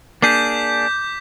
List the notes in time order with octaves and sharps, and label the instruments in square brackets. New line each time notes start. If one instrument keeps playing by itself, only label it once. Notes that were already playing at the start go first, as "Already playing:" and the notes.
[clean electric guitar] A#3 D4 G#4 [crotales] D6 G6 B6